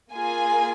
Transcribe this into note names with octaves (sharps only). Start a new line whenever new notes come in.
A#3 F4 G#4 G#5